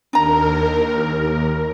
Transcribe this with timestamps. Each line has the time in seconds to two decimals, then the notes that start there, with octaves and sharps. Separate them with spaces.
0.13 D#2 D4 A#4 A#5